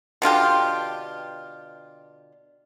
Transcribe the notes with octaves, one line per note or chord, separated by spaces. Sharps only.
B2 D3 F4 G4